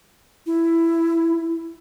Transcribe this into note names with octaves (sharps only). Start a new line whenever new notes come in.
E4